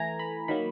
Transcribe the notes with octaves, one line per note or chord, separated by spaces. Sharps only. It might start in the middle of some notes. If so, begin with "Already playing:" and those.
Already playing: E3 A3 G#5 A#5
B5
D#3 F#3 A#3 B5